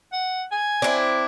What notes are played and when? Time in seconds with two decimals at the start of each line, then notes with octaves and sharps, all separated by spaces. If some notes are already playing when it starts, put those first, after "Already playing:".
0.13 F#5
0.51 G#5
0.82 C4 D4 E4